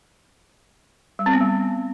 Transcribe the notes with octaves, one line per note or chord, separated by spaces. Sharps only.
G3
C4
B3
G3